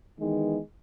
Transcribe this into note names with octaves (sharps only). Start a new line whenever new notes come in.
D#3 E3 G#3 B3 D#4